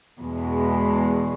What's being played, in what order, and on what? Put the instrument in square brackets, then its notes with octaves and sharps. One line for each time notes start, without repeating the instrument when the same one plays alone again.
[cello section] E2 B2 G#3